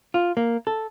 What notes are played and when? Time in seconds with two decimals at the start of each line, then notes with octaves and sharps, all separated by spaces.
0.14 F4
0.37 A#3
0.67 A4